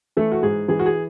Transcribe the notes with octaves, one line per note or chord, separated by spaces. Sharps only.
E3 A3 A4
F#4
G#2 G#4
E3 G#4
F#4
G#4